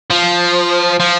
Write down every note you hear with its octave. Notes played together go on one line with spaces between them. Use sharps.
F3
F3